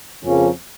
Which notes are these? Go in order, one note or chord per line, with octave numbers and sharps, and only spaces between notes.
F2 C#3 F3 A#3 C#4